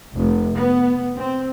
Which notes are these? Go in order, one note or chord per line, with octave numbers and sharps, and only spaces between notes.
F1
B3
C4